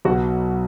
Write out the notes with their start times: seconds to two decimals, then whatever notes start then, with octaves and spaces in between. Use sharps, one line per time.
0.05 B1 B2 B3 F#4